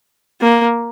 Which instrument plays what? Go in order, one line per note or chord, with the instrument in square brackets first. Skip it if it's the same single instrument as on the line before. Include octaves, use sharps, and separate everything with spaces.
[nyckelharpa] A#3